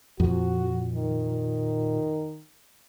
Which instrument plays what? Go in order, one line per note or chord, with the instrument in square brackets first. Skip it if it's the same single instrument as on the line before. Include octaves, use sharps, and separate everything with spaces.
[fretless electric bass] F2 [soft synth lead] A#2 [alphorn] F#4
[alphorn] D#3